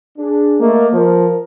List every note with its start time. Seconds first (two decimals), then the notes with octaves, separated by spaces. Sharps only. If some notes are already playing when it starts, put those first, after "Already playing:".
0.18 D4 G#4
0.61 A3 A#3 D#5
0.93 F3 A#4